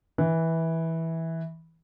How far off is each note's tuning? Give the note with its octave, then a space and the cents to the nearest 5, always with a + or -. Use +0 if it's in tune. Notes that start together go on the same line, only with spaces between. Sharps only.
E3 -15